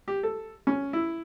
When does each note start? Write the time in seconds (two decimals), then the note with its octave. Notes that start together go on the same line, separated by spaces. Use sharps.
0.08 G4
0.23 A4
0.67 C#4
0.93 E4